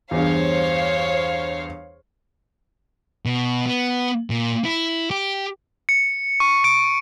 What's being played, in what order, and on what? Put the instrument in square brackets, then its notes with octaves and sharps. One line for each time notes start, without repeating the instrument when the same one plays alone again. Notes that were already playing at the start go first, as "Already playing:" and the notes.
[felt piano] E2 G2 [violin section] C5 C#5 F5
[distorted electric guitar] B2
B3
A#2
E4
G4
[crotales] C#7
C#6
D7